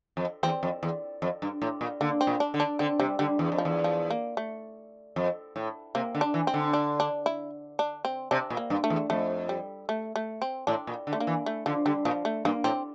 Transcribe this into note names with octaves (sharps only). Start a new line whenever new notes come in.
F2
E2 C4
F2
E2
F2
G2
A2
A#2
D3 A#3
C4
A#2
D4
D3
D4
D3 C4
C3 G3
D3 G3
E2
F2
F3
E2
F3
A#3
A3
F2
A2
C3 A#3
D3
D4
E3
C4
D3
D4
D4
E4
D4
C4
C3 D4
A#2
A#3
G2
A3
E2
F2 A3
G3
A3
A3
C4
A2 D4
A#2
D3
A3
A#3
E3
A3
D3 F3
D3 G3
A#2 F3
A3
G2 A#3
A2 C4